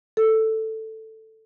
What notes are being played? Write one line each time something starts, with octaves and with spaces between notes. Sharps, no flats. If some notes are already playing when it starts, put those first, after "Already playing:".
A4